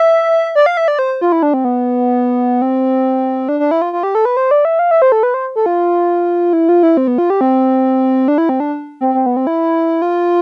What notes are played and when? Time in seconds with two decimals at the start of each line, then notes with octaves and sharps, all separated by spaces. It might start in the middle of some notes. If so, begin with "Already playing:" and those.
Already playing: E5
0.55 D5
0.66 F5
0.77 E5
0.88 D5
0.99 C5
1.21 F4
1.32 E4
1.43 D4
1.54 C4
1.65 B3
2.62 C4
3.49 D4
3.60 D4
3.71 E4
3.82 F4
3.93 F4
4.03 G4
4.15 A4
4.25 B4
4.37 C5
4.51 D5
4.65 E5
4.79 F5
4.91 E5
5.02 C5
5.12 A4
5.23 B4
5.34 C5
5.56 A4
5.66 F4
6.53 E4
6.69 F4
6.83 E4
6.97 C4
7.07 B3
7.18 F4
7.30 G4
7.41 C4
8.28 D4
8.38 E4
8.49 C4
8.60 D4
9.01 C4
9.15 C4
9.26 B3
9.37 C4
9.47 E4
10.02 F4